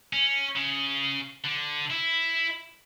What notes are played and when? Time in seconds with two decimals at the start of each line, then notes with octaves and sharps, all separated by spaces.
0.13 C#4
0.55 C#3
1.44 D3
1.90 E4